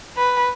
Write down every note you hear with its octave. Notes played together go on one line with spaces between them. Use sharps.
B4